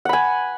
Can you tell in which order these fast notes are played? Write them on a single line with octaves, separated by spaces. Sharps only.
F#5 B5 G#5